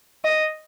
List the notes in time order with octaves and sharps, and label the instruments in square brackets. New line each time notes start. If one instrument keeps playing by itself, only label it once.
[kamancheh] D#5